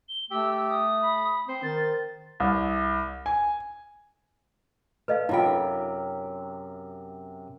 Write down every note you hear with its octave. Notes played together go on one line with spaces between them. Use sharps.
G7
A3 G4 E6
D#6
B5
C4 C5
D#3 A6
C2
G#5
A3 B4 D#5 F5
F#2 C3 D#4 F4 G5